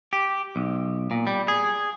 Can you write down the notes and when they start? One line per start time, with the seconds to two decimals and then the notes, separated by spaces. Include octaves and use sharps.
0.13 G4
0.56 B1
1.11 A#2
1.27 G3
1.48 G#4